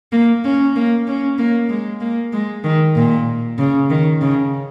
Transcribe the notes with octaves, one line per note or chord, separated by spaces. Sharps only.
A#3
C#4
A#3
C#4
A#3
G#3
A#3
G#3
D#3
A#2
C#3
D#3
C#3